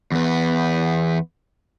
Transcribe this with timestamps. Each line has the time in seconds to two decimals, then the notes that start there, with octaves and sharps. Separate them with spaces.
0.12 E2 B3